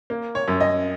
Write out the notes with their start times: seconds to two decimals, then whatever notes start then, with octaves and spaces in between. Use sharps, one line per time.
0.10 A#3
0.35 C#5
0.48 F#2
0.60 D#5